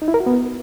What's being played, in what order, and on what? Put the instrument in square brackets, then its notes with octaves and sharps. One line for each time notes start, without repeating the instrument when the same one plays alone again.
[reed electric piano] D#4
E4
A#4
F#4
B3